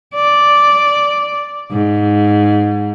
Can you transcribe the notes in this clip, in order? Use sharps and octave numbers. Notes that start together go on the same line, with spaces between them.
D5
G#2